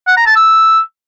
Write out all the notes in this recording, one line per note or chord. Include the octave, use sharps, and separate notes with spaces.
F#5
A#5
A5
E6